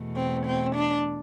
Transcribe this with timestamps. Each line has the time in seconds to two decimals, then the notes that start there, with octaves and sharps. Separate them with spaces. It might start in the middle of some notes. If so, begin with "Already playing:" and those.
Already playing: E2 B2 A3
0.17 C4
0.47 C4
0.75 D4